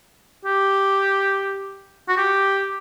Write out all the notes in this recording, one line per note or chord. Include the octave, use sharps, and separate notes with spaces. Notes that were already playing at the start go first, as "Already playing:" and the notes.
G4
F#4
G4